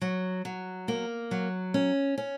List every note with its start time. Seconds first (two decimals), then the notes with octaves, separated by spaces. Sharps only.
0.01 F#3
0.45 F#3
0.88 A#3
1.31 F#3
1.74 C#4
2.18 C#4